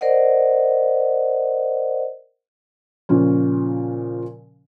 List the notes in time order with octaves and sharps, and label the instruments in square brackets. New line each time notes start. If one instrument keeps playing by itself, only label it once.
[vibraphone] A#4 C5 D5 D#5 F#5
[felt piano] A#2 C#3 F3 C#4